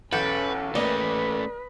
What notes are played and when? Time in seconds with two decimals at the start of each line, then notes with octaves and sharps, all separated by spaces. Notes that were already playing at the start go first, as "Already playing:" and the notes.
0.13 B1 E2 C#4 A4 B4 F#5 G5
0.75 A3 A#3 C#4 B4 D5 D#5